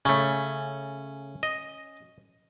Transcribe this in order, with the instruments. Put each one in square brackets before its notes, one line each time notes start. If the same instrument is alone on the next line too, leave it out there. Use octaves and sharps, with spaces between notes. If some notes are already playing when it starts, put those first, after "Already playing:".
[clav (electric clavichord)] C#3 A3 [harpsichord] C#4
[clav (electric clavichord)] D#5